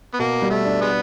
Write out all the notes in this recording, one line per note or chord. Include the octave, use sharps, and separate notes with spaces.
B3
B2 A#3
G3
A3
D4
G#3 B3